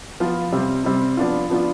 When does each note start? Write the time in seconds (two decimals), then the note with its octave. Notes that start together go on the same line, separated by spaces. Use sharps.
0.20 F3 B3 F4
0.52 C3 G3 C4
0.85 C3 G3 C4
1.17 F3 B3 D4 F4
1.50 F3 B3 D4 F4